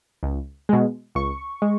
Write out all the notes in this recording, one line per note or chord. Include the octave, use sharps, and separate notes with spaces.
C#2
B2 G#3
C#2 C#6
G#3